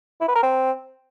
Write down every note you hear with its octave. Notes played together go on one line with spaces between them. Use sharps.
E4
B4
A#4
C4